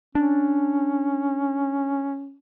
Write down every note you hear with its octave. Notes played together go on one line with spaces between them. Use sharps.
C#4 D4